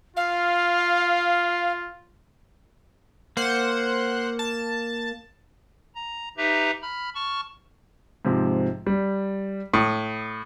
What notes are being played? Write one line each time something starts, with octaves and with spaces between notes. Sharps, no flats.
F4 F5
A#3 C5 F#5
A5
A#5
D#4 G4 B4 E5 A#5
B5 F6
A5 C#6 F6
G#2 C3 F3
G3
A2 D#6